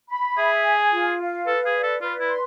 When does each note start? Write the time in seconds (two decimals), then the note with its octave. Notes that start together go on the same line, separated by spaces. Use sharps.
0.09 B5
0.37 G#4 E5
0.64 G#5
0.91 F4
1.20 F5
1.46 A4 B4
1.65 G#4
1.75 D5
1.83 A4
2.01 F4 B4
2.19 E4
2.29 C6